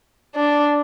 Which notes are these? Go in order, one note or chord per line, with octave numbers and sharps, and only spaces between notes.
D4